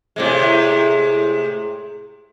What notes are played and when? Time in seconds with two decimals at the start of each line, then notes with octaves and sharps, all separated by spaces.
0.16 A2 C3 G#3